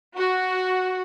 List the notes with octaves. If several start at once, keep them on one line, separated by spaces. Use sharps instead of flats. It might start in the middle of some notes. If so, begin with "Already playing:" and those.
F#4